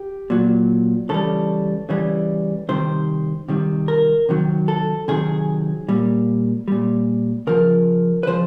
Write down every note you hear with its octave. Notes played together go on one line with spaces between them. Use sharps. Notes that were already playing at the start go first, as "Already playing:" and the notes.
Already playing: G4
A#2 F#3
C#3 E3 G3 A4
C#3 E3 G3
C3 D#3 G3 C5
C3 D#3 G3
A#4
C3 D#3 F#3
A4
C3 D#3 F#3 G#4
A#2 G3
A#2 G3
C#3 F3 A#4
B4
C#3 F3 C5